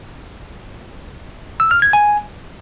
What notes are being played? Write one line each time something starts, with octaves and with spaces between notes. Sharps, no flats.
E6
F6
G#6
G#5